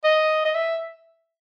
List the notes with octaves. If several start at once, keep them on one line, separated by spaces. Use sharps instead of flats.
D#5
D#5
E5